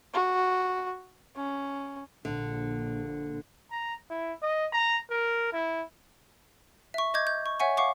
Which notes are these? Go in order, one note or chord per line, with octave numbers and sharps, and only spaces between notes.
F#4
C#4
A#1 D3
A#5
E4
D#5
A#5
A#4
E4
E5 C#6
D#5 D6 G6 G#6
G6
C#6
C#5 E5 F#5 G#5 C#6
F5 F#5 C#6 D6